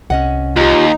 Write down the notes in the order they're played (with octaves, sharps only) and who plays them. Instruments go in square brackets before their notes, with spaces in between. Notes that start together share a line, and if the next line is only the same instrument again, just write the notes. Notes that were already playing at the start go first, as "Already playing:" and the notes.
[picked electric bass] C2 [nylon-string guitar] C#4 D#5 F#5
[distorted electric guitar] D#2 [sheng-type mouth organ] D#4 [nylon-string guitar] F4 G4